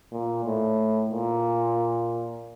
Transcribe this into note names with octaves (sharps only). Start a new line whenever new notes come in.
A#2
A2
A#2